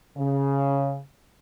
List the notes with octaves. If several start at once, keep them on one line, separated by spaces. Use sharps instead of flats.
C#3